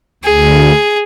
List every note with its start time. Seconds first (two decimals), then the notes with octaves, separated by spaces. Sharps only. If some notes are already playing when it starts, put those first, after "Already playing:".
0.24 D2 G#4